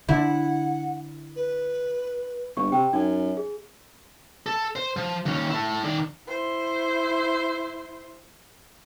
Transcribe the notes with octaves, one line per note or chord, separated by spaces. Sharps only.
D3 E4 F#5
B4
G1 C#6
C3 G5
F#2 D#4
G#4
A4
C5
F3
D#2 C#4
E4 A4
D#3 D5
E4 C5